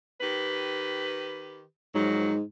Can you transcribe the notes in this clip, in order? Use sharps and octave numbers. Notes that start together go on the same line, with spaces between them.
D#3 G4 B4
G#2 D#3 F3 F#3